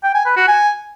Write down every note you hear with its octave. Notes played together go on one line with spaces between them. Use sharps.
G5
G#5
B4
F#4
G#5